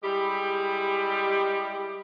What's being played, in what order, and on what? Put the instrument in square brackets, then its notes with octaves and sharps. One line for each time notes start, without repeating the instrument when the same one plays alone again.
[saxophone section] G3 G#3 E4 G4